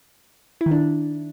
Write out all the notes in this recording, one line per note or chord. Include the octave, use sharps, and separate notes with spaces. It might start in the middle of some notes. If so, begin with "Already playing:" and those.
E4
D#3
D4